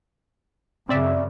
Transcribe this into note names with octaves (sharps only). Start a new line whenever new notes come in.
F#2 C#3 C4 D5 E5